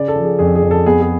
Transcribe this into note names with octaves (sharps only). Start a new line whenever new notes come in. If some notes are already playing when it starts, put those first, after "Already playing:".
Already playing: C#3 D5
A4
F3
G#4
F2 G#4
G#4
F2
A4
B3 G#4
G#4